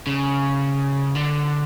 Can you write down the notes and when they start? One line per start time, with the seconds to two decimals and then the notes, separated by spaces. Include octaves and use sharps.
0.07 C#3
1.15 D3